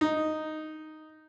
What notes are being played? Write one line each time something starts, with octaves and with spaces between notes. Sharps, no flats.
D#4